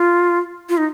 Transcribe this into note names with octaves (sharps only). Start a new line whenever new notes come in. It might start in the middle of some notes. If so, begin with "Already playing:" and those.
Already playing: F4
F4
D#4